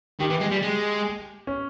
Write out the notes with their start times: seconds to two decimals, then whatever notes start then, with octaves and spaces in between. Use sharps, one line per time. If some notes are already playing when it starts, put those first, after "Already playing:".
0.20 D#3 G4
0.30 E3
0.41 G#3
0.51 G3
0.63 G#3
1.47 C#4